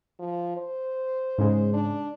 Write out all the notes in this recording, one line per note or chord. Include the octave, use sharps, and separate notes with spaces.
F3
C5
G#2 C#3 G#3
D4